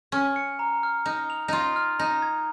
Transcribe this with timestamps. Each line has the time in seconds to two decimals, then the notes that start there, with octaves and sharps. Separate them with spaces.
0.12 C#4 F6
0.36 C#7
0.59 A#5
0.83 F6
1.06 D#4 F6
1.30 F7
1.48 D#4 F4 F7
1.76 F6
1.99 D#4 A#5
2.22 G#6